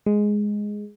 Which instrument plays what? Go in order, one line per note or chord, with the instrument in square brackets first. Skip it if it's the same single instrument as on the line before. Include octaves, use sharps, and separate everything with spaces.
[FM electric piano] G#3